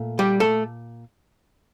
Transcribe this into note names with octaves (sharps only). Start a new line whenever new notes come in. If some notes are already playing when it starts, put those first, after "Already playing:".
Already playing: A#2 A3
G3 G4
A3 A4